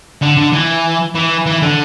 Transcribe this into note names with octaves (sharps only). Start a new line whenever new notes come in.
D3
D3
E3
E3
E3
D3